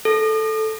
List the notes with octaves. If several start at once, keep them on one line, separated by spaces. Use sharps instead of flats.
A4